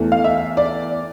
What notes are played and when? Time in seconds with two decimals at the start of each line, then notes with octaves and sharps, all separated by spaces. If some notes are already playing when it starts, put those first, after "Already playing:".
Already playing: E2 E3 A3
0.12 F5
0.24 E5
0.57 D5